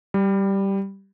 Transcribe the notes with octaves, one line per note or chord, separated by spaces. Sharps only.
G3